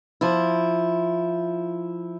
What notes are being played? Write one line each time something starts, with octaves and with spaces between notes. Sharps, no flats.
F3 E4